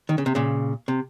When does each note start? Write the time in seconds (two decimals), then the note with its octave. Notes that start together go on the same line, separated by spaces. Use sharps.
0.09 D#3
0.18 C#3
0.26 C3
0.35 A#2 C#3
0.88 C3